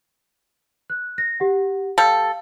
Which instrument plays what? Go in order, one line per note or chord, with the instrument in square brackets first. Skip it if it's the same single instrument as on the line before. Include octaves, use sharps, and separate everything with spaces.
[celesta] F#6
A#6
G4 F#5
[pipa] G3 A4 [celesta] F5